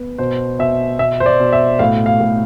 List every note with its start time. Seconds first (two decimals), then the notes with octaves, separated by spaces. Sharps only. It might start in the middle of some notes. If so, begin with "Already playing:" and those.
Already playing: B3
0.18 B2 C5
0.59 B2 E5
0.99 B2 E5
1.20 C5
1.26 D5
1.40 B2
1.53 E5
1.79 A2 F5
2.06 F5
2.20 A2